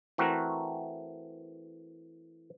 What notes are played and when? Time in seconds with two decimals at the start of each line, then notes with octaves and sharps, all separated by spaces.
0.18 E3 A3 C4 F#4 A#4